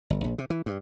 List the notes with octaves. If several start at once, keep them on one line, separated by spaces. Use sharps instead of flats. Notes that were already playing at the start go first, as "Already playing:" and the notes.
G1
A#1
C3
E3
G2